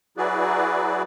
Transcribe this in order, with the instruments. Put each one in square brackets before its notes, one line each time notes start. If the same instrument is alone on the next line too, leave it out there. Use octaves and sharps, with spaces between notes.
[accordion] F#3 E4 F#4 G#4 B4 D5